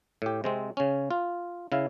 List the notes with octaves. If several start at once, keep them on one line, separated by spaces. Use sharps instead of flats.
A2 G4
C3 G#3 C4
C#3 C#4
F4
C#3 E4 F5